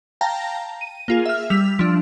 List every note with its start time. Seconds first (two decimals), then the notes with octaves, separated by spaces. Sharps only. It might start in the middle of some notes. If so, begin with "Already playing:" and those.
0.21 F5 G5 A5 A#5 A#6
0.81 D#7
1.08 A#3 F4 G#4
1.26 E5 F6
1.50 G3 E6 B6 F7
1.79 F3 D4